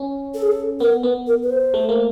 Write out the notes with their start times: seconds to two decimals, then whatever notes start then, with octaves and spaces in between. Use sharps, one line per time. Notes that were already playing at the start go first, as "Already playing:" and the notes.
Already playing: C#4
0.34 A4
0.42 G#4
0.51 A4
0.80 B3 A#4
1.03 B3
1.27 A#4
1.43 B4
1.50 C5
1.74 A3
1.89 A#3